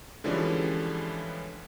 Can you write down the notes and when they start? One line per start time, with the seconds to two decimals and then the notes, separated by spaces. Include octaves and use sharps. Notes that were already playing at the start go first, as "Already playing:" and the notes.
0.24 D3 E3 F3 G3 G#3 C#4